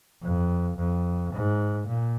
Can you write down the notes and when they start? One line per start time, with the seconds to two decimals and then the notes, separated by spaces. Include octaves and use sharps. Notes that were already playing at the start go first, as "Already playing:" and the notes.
0.23 F2
0.77 F2
1.33 G#2
1.88 A#2